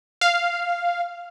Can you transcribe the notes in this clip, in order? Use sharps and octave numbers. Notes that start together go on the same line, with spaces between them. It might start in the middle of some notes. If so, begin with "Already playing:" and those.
F5